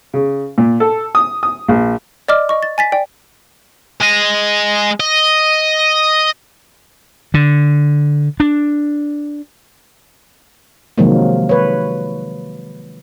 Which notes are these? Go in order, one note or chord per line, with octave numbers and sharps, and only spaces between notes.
C#3
A#2
A4
D#6
D#6
A#1
D5 D#5 D6 F6
D#5 C#6
A6
G#5 A6 B6
D5 G5
G#3 D#5
D#5
D3
D4
C3 D#3 F3 F#3 G#3 A#3
B4 C#5